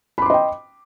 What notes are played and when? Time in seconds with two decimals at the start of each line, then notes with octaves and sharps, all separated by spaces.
0.18 B5
0.22 D6
0.26 C6
0.30 D#5
0.34 G5